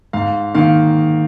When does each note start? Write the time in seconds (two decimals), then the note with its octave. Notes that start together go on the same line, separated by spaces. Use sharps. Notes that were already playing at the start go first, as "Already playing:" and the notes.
0.13 G#2 F5
0.55 D#3 A#3 F5